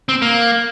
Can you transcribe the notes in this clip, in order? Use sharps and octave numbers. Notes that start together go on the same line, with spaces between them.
C4
A#3